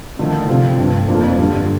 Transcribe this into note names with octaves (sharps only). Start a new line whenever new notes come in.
D3 D#3 F3 A3 D4
C3 F3 C4 F4
G2 F3 A3 C4
F2 F3 A#3 D4 F4
G2 D3 G3 D4 F4